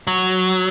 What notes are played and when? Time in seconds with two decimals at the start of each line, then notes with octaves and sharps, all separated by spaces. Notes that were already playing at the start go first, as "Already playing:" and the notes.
0.07 F#3